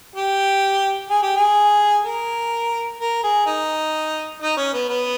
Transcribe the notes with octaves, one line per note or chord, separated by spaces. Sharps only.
G4
G#4
G4
G#4
A#4
A#4
G#4
D#4
D#4
C#4
B3
B3